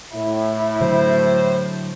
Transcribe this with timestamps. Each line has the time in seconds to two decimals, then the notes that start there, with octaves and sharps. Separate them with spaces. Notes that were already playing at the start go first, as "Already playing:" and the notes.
0.15 A2 E4
0.81 D3 F#3 C5